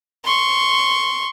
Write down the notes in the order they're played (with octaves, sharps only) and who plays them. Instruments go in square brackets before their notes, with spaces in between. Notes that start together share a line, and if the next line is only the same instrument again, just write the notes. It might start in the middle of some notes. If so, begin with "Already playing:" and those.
[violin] C6 C#6